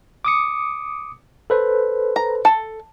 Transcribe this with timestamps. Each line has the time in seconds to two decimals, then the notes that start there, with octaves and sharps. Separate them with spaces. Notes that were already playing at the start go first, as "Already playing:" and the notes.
0.25 D6 D#6 C#7
1.50 A4 B4 C5
2.16 A#5
2.45 A4